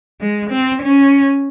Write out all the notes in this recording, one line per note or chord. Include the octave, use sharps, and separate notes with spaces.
G#3
C4
C#4